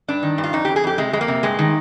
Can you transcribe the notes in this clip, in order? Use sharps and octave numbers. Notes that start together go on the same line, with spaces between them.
G2 D4
D#3
G2
F4
F2 D#4
F2 G4
G#4
F2 G4
C3 G#3
F2 G#3
A#3
C3
G2 G#3
D#3